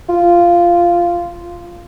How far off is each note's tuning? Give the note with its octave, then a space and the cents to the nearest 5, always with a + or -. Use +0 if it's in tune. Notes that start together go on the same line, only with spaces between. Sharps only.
F4 -10